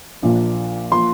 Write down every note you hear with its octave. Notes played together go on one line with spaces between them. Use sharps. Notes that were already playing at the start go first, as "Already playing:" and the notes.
A#1 A#2 F3 A#3
F3 A#3 C6